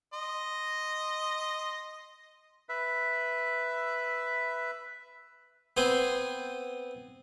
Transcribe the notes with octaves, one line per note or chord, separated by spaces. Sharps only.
D#5 C6
B4 E5
B3 C4 C5 G#5 C6